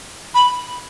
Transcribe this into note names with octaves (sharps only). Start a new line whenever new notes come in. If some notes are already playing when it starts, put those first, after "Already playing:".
B5